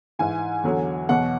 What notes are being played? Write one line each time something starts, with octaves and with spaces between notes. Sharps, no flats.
G#2 E3 G#5
E2 D3 F#3
E2 B2 F#3 F#5